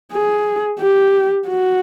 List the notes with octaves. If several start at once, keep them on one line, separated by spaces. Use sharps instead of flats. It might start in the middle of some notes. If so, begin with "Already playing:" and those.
G#4
G4
F#4